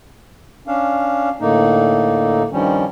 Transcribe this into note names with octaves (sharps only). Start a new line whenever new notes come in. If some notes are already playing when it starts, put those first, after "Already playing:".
C#4 D4 F5
A2 D3 A#3 D#4
G2 D#3 F3 G3 C#4